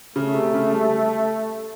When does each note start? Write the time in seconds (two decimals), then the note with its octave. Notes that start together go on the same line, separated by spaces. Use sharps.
0.16 C#3 A3
0.34 C3
0.54 C#3
0.73 G3